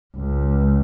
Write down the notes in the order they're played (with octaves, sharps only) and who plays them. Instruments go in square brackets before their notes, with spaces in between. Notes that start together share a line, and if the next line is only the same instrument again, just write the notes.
[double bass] C#2